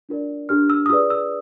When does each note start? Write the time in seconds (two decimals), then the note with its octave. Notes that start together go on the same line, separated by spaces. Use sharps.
0.09 D4 F4 A#4 D5
0.49 D4 G4 A#4 F6
0.70 E6
0.86 D#6
0.89 F4 G#4 B4 D5 E6
1.10 E6